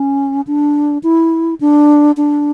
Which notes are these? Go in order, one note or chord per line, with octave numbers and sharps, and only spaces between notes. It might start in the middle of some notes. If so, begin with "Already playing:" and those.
Already playing: C#4
D4
E4
D4
D4